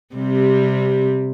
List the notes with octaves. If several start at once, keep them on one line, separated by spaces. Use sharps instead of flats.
C3 G3 C4